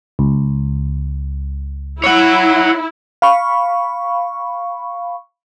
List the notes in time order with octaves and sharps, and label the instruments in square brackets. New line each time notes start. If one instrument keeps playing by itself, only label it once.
[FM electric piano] C#2
[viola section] E4 [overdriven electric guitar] C#5 F#5
[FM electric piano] F5 B5 C#6